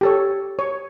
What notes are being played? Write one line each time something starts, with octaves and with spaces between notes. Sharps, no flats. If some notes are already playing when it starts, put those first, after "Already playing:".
G4 A4 C#5
C#5